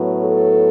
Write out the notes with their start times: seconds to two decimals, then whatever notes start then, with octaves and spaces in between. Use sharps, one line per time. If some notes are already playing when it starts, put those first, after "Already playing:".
Already playing: A2 F#3 B3
0.22 A4